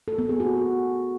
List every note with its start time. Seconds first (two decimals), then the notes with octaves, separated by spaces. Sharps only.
0.08 A4
0.18 B3
0.29 G#4
0.40 F#4